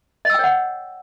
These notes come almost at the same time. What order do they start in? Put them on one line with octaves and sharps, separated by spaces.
D#5 E6 G5 C#5 F#5